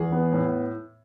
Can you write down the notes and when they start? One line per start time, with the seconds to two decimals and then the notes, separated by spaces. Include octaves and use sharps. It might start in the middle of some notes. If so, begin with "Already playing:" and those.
Already playing: E2 G#4
0.12 B3
0.33 A2